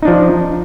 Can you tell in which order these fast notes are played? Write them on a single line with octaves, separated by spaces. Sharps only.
D#4 D4 F3